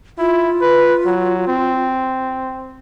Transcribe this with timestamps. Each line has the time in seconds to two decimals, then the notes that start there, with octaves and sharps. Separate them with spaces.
0.18 E4 F4
0.61 B4
1.06 F#3
1.47 C4